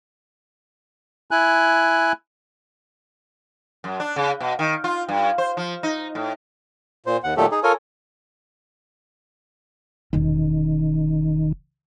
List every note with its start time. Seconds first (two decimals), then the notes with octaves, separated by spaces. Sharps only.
1.31 E4 G#5 F#6
3.84 F#2
4.00 D4
4.16 C#3
4.40 B2
4.59 D#3
4.84 F4
5.09 G2
5.38 C5
5.57 F3
5.83 D#4
6.15 A2
7.06 A#2 C5
7.24 D#2 F#5
7.37 A#2 D#3 F#3 A3 G4 A4
7.52 D#4 G#4
7.64 F4 A4 A#4 C#5 G#5
10.13 E1 D#3 C#4